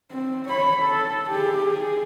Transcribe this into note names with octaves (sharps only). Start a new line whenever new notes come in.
C4
C#5 B5
A4
G4 G#4
G#4